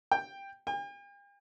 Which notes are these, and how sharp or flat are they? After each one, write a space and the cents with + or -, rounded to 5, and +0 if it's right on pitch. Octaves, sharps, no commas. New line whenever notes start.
G5 +10
G5 +45